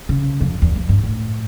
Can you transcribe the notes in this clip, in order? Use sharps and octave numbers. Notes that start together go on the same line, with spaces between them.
C#3
F2
E2
F2
G2
A2